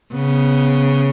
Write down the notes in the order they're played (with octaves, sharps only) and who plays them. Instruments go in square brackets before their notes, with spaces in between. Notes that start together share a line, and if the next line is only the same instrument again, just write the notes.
[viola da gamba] C#3 [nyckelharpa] B3